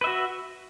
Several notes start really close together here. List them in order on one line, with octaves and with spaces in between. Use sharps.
B4 E5 F#4